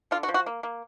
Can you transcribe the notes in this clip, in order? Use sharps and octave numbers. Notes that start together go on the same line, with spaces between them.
D3 F4
F#4
F3
F#4
A#3
A#3